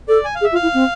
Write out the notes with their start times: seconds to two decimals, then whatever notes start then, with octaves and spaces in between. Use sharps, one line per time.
0.08 A4 D5
0.24 G#5
0.35 F5
0.41 G#4
0.44 E5
0.52 F4
0.55 F5
0.63 E4
0.74 C4